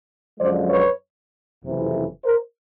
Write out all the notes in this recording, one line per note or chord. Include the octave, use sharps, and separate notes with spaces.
F#2 D3 F3 G#3 C5 D5
B4 C#5
F#1 F2 C3 E3
A#4 C5